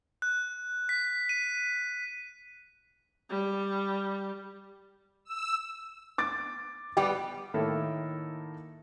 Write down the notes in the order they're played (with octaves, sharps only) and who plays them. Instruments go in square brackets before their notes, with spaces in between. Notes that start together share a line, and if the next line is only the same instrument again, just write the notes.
[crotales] F#6
B6
D#7
[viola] G3
[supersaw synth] E6
[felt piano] D6 A6
[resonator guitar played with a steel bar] G3 B3 G4 [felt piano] G5
[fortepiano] A2 D#3 A#3 E4 A4 A#4